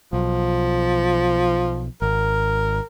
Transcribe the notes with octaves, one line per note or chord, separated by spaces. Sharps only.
B1 F3
G#1 A#4